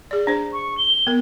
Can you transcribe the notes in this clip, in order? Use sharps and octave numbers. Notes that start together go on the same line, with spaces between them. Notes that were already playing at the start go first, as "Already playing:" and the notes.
G#4 D5
D4 C5
C#6
G7
B3 A#4